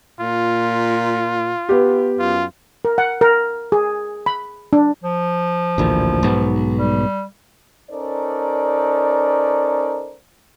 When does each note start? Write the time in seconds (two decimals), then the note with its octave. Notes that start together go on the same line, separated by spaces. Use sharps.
0.20 A#2 F4
1.69 B3 G4
2.19 F#2 F4
2.85 A#4
2.98 F#5
3.21 A#4
3.72 G#4
4.26 B5
4.73 D4
5.03 F3
5.78 A1 D2 A#2
6.23 B1 G#2 B3
6.79 G3
7.91 C#4 D#4 A4 A#4 C5 D5